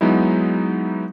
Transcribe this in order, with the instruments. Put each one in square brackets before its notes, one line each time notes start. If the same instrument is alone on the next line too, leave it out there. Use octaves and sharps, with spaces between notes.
[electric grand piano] F#3 G#3 B3 D#4 E4